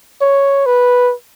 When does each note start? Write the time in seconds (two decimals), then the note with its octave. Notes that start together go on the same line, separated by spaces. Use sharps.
0.21 C#5
0.66 B4